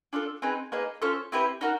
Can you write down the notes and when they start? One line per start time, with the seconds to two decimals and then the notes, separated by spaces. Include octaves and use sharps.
0.13 D4 F4 A4
0.42 C4 D#4 G#4 B4
0.72 A#3 D#4 G#4 B4
1.02 C#4 F4 A4 C5
1.32 C4 E4 G4 B4
1.61 D#4 F#4 A#4